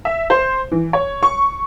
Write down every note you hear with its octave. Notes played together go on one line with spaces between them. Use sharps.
E5
C5
E3
C#5
C#6